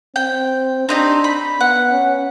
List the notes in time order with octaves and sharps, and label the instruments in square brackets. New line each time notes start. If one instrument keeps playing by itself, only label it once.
[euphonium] C4 [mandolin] G5
[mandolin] C4 D#4 G4 [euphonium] D4
[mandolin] B5
[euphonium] B3 [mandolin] F#5
[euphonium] C#4